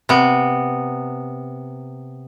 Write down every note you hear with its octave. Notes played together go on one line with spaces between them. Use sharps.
C3 B3